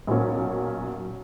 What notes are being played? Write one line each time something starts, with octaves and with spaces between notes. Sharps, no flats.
B1 A#2 F#3 A#3 C#4